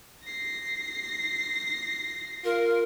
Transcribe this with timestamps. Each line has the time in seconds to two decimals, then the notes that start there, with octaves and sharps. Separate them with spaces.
0.24 A#6 C7
2.45 F4 A#4